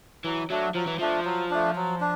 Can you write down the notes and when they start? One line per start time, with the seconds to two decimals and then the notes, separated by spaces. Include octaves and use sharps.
0.24 E3 F#3
0.50 F#3 A3 D4
0.75 F3 F#3
0.87 E3
0.99 F3 A3 D4
1.25 F#3
1.50 A3 D4
1.75 F#3
2.00 D4